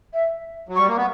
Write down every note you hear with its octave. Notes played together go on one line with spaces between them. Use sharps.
E5
F#3
G3 C#6
A#3
B3